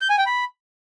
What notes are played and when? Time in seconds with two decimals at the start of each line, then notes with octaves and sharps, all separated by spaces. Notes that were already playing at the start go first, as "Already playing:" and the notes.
0.01 G6
0.10 G#5
0.18 G5
0.26 B5